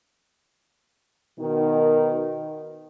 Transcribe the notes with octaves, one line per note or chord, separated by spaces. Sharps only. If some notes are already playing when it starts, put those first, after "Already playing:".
B2 D#3